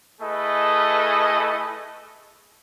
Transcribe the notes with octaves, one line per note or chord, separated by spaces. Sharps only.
A3 E4 G#4 A4 B4 D#5